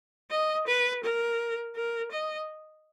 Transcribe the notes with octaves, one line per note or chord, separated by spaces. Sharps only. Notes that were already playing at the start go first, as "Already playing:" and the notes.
D#5
B4
A#4
A#4
D#5